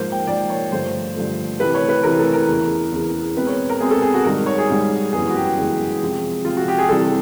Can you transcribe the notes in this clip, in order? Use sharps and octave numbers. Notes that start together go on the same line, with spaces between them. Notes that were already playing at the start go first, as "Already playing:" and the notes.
Already playing: G#2 F3 A#3 C5
G5
G#2 F3 A#3 D5
C#5
G2 D3 F3 A3 C5
G2 D3 F3 A3
C3 E3 A3 B4
C#5
B4
C3 E3 A3 A#4
A4
A#4
E2 C#3 E3
E2 C#3 E3
B2 G#3 C4 B4
C#5
A#4
B2 G#3 C4 G#4
A4
G#4
F#4
G#2 D#3 G3 A#4
C#5
G#4
G#2 D#3 G3
F#2 C#3 E3 G#3 B3 G#4
F#4
G4
F#2 C#3 E3 G#3 B3
C3 F3 G#3 C4
C3 F3 G#3 C4 F4
F#4
G4
G#4
C3 E3 G3 C4 A4